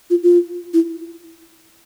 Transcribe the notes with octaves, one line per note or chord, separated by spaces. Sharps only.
F4
F4
E4